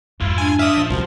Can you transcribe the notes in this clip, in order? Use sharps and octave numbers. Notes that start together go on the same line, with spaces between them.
F2 G#2 E4 F4
D4 G#5
D5 E5 F5 D#6
A#2 F3
C2 F#3 F#4